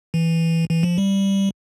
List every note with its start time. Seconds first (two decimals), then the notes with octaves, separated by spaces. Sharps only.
0.14 E3
0.69 E3
0.83 F3
0.98 G3